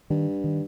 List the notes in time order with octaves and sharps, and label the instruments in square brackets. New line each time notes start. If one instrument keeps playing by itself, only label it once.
[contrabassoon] G2 [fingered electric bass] D#3
[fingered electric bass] D#3